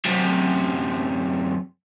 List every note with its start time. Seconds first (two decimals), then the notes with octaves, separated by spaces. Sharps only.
0.05 F#2 C3